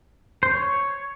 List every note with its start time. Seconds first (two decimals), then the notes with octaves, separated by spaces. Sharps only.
0.43 C5
0.51 C#5